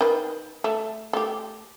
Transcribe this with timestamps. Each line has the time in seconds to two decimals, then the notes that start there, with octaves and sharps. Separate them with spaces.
0.01 D#3 B4
0.64 A3
1.13 A3 G4